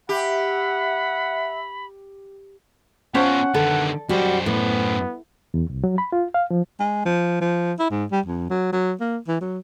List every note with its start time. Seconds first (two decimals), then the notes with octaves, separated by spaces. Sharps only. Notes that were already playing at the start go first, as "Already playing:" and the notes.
0.09 G4 E5 F#5 B5
3.15 B3 C#4 F4 C5 F#5 A5
3.54 D3 D#3 B3 A4
4.09 F#2 G3 F#4 C5
4.46 A2 B3
5.54 E2
5.70 C2
5.84 F#3
5.98 B5
6.12 F4
6.34 F5
6.51 F3
6.80 G#3
7.05 F3
7.41 F3
7.79 E4
7.91 G#2
8.11 G3
8.26 F2
8.50 F#3
8.72 F#3
9.00 A#3
9.28 E3
9.41 F#3